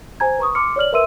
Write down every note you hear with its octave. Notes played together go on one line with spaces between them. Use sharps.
C5 G#5 A#5 G#6
B4 A#5 C#6 D#6
C6 D6 F6 C#7
C#5 D5 F6 F#7
A#4 B4 E5 C6 E6 D#7